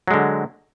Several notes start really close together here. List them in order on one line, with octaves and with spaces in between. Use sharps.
F#3 G#3 D3